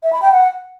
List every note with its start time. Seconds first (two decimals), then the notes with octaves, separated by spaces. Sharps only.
0.03 E5
0.13 B5
0.22 G5
0.32 F#5